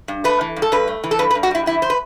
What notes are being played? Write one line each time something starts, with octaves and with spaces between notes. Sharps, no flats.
G2
A3 B4
E3
G2
A4
G2 B4
A3
E3
A4
G2 B4
B4
G2
F#4
G3 E4
E3 E4
C5
B4